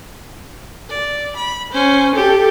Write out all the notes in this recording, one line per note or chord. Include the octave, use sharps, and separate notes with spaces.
D5
B5
C#4 C5
G4 A4